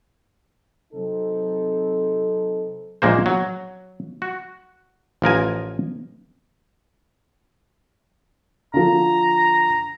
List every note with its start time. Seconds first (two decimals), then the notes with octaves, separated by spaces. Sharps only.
0.94 C3 F#3 C4 D#4 A4
3.02 A#1 G#3 A#3 C5
3.26 F#3
4.22 F#4
5.22 A1 F3 A#4 G#5
8.74 D3 F3 A#5